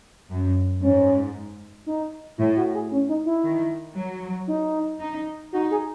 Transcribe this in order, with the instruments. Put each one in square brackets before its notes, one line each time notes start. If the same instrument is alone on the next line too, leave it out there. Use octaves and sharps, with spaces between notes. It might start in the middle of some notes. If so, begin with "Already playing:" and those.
[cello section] F#2
[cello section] G#2 [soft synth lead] C#4
[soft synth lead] D#4
[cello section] A2 [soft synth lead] E4
[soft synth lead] F#4
G#4
C#4
D#4
E4
[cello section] D#3
F#3
[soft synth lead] D#4
[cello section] D#4
[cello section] D#4 [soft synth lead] F#4
[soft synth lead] G#4